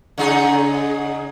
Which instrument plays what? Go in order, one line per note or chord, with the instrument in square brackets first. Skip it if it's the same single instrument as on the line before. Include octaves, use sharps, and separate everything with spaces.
[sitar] C#3 D#4 G#4